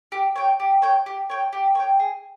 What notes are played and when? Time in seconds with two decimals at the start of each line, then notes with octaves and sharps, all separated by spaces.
0.12 G4
0.36 C#5 G5
0.60 G4
0.82 C#5 G5
1.06 G4
1.30 C#5 G5
1.53 G4
1.75 C#5 G5
1.99 G#4